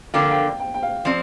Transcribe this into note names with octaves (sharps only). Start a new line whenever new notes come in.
D3 F3 A#3 F4 G5
F5
G5
G5
G5
F5
F3 C4 D5